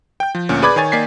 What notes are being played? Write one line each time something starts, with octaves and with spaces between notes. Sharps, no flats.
G5 G6
F3
D2 A#2 C#4
G#4 B4 D5 B5 D6 G#6
D#3 C#5 G#5 A6
D#3 A#3 D5 G#5 B6 C7